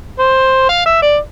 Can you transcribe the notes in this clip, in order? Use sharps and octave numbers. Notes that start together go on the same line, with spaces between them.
C5
F5
E5
D5